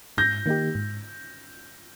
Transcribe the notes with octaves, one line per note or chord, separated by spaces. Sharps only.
G#2 G6 A#6
D#3 A#3 D#4 G4
G#2